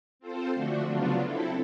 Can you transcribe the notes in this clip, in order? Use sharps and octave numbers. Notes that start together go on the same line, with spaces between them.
C4 F4 A4 C5
D3 F3 A3 D4 F#4
C#3 F#3 B3 D4 F4
C4 E4 A4